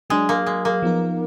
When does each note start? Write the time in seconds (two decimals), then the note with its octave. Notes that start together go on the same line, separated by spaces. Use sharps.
0.10 F#3 G#3 D4 G#4
0.29 A#3
0.46 G#3
0.65 A#3
0.82 F3 B3 D#4 A#4